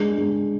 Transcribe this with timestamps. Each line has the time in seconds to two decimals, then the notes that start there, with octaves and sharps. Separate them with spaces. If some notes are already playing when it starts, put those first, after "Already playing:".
Already playing: G#3 D4
0.18 G#3